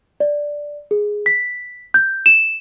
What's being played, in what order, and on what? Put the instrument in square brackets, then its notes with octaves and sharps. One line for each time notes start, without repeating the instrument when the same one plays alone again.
[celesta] D5
G#4
B6
G6
E7